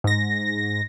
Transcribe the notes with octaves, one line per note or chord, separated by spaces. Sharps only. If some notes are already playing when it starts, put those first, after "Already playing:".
G#2 A#6